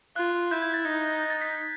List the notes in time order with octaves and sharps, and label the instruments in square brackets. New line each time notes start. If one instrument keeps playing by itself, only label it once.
[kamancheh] F4 [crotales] F#6
[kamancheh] E4 [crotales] G6
[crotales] G#6
A6
[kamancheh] D#4
[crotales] A6
B6